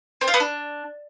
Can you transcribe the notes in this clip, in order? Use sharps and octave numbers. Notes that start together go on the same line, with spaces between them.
C4
F4
B3
D4